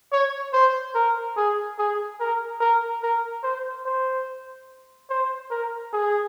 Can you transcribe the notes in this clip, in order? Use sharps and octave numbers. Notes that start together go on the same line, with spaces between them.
C#5
C5
A#4
G#4
G#4
A#4
A#4
A#4
C5
C5
C5
A#4
G#4